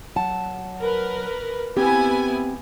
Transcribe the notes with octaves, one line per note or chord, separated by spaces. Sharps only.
F#3 F#5 A5
A#4 B4
B3 C4 E4 G4 G#5